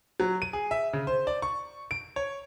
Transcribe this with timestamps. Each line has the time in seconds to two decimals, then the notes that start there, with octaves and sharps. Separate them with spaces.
0.20 F#3
0.42 D#7
0.53 G#4
0.71 E5
0.93 C#3
1.07 C5
1.27 D5
1.42 C#6
1.91 D7
2.16 C#5